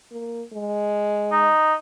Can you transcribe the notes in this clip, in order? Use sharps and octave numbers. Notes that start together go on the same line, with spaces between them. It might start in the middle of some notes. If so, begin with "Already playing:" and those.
A#3
G#3
D#4